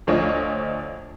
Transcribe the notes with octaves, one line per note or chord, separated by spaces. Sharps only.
D2 F3 D4 C#5 D#5